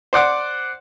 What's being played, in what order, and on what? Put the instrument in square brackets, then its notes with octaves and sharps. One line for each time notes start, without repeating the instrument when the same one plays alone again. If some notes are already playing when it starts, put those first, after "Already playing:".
[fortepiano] C5 D5 F#5 D6